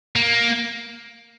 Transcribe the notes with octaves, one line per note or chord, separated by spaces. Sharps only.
A#3